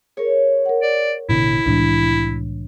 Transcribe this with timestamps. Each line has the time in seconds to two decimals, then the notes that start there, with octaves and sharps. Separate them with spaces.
0.17 G#4 A#4 C#5
0.66 A#4 F#5
0.82 D5
1.29 A1 B2 D3 E4
1.66 C2 A2 E3 G#3 D4